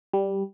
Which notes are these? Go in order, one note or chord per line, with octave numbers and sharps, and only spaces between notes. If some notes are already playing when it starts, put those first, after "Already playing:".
G3